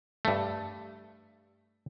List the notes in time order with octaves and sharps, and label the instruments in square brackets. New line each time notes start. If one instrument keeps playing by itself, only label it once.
[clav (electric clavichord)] G2 A3